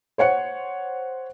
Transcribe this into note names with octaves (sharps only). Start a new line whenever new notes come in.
C5 C#5 F#5 C#7